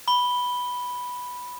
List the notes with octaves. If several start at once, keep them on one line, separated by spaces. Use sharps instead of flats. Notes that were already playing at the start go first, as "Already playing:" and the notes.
B5 G7